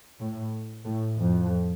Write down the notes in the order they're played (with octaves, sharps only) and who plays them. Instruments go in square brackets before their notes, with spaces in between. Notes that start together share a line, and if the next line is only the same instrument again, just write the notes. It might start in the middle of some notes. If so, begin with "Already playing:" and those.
[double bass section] A2
A2
F2